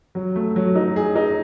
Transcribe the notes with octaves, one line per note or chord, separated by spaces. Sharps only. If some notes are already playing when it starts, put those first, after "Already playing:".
F#3
A3
F#3
D#4
G#4
D#4